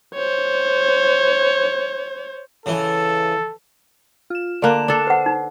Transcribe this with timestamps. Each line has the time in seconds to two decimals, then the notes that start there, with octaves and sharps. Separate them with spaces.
0.14 C5 C#5
2.66 C#3 E3 A4
4.30 F4 E7
4.62 D3 A#3 D5 F5 A5 F#6
4.88 D4 A4
5.07 B4 C5 F#5
5.26 D#4